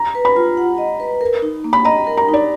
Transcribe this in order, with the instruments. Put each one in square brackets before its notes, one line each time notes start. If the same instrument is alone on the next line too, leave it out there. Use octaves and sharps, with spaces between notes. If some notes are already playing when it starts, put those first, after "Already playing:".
Already playing: [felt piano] A#5
[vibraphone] B4
[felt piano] B5
[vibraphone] F4
F#5
D#5
B4
A#4
D#4
A#3
[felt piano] B5
[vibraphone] D#5 [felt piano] A#5
[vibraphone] A#4
[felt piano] A#5
[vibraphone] D#4 [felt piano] D5